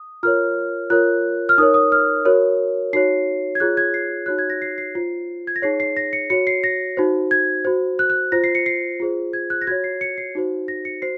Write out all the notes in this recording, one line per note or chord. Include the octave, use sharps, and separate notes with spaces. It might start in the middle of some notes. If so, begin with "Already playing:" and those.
Already playing: D#6
F4 A#4 C#5 F6
F4 A#4 C#5 F#6
F6
D#4 A#4 C#5 D#6
D#6
F6
F#4 A#4 C#5
D#4 F#4 C#5 C7
G#6
F4 G#4 C#5 F#6
G#6
C7
D#4 F#4 C#5 F#6
G#6
A#6
C7
C7
F4 C5 C7
G#6
A#6
D#4 G#4 C#5 C7
C7
A#6
C#7
F#4 C#5 C#7
C7
A#6
D#4 F#4 C5
G#6
F#4 C5
F#6
F#6
F4 C5 A#6
C7
C#7
C7
F4 G#4 C5
G#6
F#6
A#6
F#4 C#5 G#6
C7
C#7
C7
D#4 F#4 C5
A#6
C#7
F#4 C5 C7